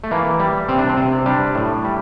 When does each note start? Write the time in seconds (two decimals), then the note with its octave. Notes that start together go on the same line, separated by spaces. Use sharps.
0.04 A3
0.11 E3 A#3
0.39 G3
0.69 C3 C4
0.79 D4
0.89 C4
0.97 C3
1.26 G3 D4
1.55 A2
1.84 G3